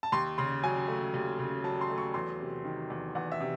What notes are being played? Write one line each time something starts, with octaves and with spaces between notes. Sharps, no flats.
A5
D#2 C6
C#3 C6
F#3 G#5
A3
D#2
C#3
F#3 A5
C6
A3
C#6
E2 C6
C3
D#3
E2
E2 F#5
E5
C3